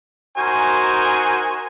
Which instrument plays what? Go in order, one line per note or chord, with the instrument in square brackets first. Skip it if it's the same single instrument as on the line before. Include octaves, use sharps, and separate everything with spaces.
[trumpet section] D#4 F#4 A#4 C5 G#5 C#6